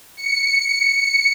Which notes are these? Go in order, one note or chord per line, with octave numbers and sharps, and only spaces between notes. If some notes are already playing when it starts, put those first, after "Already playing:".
C#7